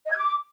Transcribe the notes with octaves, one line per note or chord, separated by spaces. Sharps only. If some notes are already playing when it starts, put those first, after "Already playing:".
D#5
G#6
D6